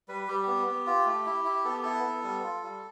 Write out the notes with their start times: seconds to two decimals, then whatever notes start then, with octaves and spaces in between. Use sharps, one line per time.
0.08 G3 B4
0.28 G3 G4
0.43 B3 G4
0.67 B3
0.86 F4
1.06 A3
1.26 E4
1.45 E4
1.65 B3 A4
1.74 G4
1.83 E4 A4
2.04 B3
2.24 G3
2.43 F4
2.63 G3